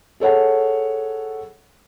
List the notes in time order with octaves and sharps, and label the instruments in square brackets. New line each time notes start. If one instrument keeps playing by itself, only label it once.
[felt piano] G#4 A4 C#5 F#5